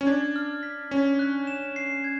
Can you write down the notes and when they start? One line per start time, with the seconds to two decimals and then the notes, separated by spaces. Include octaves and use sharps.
0.01 C#4
0.07 D4 G#6
0.36 F6
0.63 B6
0.91 C#4 B6
1.19 F#6
1.47 E7
1.76 C7
2.04 G#6